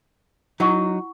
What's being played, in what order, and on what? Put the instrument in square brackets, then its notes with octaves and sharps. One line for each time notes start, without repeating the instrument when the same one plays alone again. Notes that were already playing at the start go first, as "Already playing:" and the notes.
[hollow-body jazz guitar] F#3 D#4 [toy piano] E4 F#5 C#6